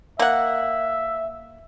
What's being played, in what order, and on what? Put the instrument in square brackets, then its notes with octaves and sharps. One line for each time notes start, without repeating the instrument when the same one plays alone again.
[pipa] A#3 F#5 [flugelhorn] E5